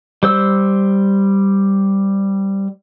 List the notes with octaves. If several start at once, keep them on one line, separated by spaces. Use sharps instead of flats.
G3 C5 E6